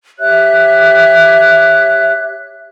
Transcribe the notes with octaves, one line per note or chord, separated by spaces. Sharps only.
G4 C#5 E5 F#6